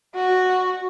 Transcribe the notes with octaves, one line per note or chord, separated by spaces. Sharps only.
F#4